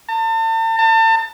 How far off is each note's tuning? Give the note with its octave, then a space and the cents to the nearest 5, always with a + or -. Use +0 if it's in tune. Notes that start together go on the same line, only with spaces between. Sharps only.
A5 +40
A5 +35